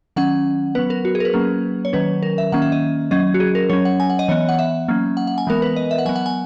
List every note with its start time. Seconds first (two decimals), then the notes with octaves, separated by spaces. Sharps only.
0.16 D#3 F#3 C#4 F#5
0.75 F#3 B3 B4
0.90 A#4
1.05 F#4
1.15 G#4
1.20 A#4
1.25 B4
1.34 F#3 A#3 C#4
1.85 C#5
1.93 D#3 F#3 C#4 B4
2.23 A#4
2.38 E5
2.52 D#3 A#3 C#4 F#5
2.62 E5
2.72 D#5
3.11 F#3 C#4 D#5
3.34 F#4
3.40 G#4
3.55 A#4
3.70 F#3 C#4 C#5
3.85 F#5
4.00 G#5
4.10 F#5
4.19 D#5
4.29 E3 B3 C#5
4.49 F#5
4.59 E5
4.88 F#3 A#3 C#4
5.17 F#5
5.27 F#5
5.38 G#5
5.47 E3 G#3 B3 A#4
5.62 B4
5.76 D#5
5.91 E5
5.98 F#5
6.05 F#3 B3 G#5
6.16 F#5
6.26 G#5